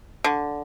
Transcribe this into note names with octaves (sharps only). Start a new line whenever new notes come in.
D3